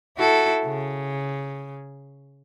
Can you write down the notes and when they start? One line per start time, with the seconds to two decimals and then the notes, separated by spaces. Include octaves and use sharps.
0.18 E4 F#4 A4
0.65 C#3